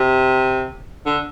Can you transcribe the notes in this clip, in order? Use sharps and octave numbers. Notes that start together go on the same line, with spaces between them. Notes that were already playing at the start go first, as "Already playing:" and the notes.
Already playing: C3
D3